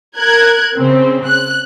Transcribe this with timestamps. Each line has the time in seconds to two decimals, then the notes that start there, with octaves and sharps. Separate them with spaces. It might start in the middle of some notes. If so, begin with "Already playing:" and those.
0.17 A#4 F#6 G#6
0.77 C#3 C4
1.26 F#6